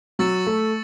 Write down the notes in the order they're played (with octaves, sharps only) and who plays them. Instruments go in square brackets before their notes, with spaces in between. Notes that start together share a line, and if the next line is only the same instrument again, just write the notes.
[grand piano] F#3 [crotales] C#6 E6 A6 C#7 E7
[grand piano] A3